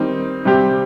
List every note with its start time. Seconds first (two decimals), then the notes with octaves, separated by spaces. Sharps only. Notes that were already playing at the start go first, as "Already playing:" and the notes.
Already playing: D#3 G3 C4 D#4
0.45 C3 G3 C4 G4